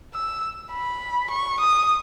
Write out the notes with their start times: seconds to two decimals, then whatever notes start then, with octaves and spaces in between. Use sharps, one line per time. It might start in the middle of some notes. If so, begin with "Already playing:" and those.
0.14 E6
0.72 B5
1.30 C#6
1.60 D#6